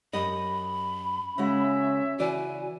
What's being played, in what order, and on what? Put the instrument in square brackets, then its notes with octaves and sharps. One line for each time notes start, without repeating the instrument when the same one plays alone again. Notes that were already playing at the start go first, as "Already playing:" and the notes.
[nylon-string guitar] F#2 G4 D#5 [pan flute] B5
[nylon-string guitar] C#3 G#3 F#4 [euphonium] C#4 [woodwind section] C#5 E5
[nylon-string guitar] C#3 E3 D5 [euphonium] F#4 [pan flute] G#5